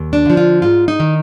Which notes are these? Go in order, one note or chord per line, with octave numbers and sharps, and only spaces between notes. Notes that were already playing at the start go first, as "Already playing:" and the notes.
Already playing: D#2
D4
D3 F3
F4
G#2 F4
D#4
D#3